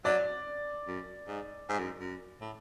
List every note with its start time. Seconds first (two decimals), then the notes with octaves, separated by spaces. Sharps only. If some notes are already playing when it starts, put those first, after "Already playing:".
0.05 F#3 D5
0.87 F#2
1.28 G#2
1.69 G#2
1.79 F#2
2.00 F#2
2.41 A2